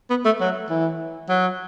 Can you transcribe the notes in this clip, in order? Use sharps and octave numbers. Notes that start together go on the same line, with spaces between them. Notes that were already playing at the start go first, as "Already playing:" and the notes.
B3
A3
F#3
E3
F#3